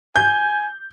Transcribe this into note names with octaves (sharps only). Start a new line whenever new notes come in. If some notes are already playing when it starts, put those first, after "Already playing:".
G#5 G6